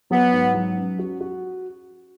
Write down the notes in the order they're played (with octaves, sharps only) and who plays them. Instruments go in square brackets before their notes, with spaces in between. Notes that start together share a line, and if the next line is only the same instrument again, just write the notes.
[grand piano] F#3 [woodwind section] B3
[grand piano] G#2
F#3
C#4
F#4
F#4